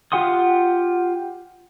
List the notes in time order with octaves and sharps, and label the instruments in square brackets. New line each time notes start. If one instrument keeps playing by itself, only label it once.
[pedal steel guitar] F4 G4 F#5 C6 D#6